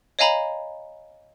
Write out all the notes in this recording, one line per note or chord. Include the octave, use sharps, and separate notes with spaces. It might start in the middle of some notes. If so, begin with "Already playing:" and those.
C#5 D#5 F5 G#5 A#5 B5